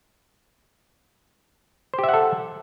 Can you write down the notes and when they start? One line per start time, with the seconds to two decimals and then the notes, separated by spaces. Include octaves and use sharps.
1.94 C5
1.99 G4
2.04 E5
2.09 F#5
2.14 A4